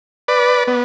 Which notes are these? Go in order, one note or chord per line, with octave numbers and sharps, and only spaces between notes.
B4 D5
B3